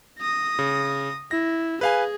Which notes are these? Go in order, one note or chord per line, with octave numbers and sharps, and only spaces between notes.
D#6 A#6
C#3
E4 A#6
G#4 B4 F5 G#5